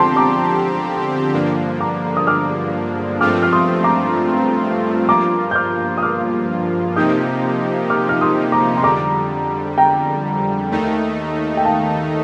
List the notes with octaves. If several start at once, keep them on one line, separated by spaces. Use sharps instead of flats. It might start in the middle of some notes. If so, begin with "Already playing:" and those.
Already playing: D3 F3 C4 G4 A5 C6
A#5 D6
G2 D3 F3 A#3 D4
A#5 D6
D#6
D6 F6
G2 F3 A3 C4 F4 D6 F6
F6
C6 D#6
A#5 D6
G2 F3 A#3 F4 A#5 D6
G6
D6 F6
D#6
D6 F6
C3 F3 A#3 D#4 G4 D#6 G6
D6 F6
F6
C6 D#6
A#5 D6
C6
F2 D3 G3 A#5 D6
G5 A#5
D#2 D#3 A3 D#4
G5
F5 A5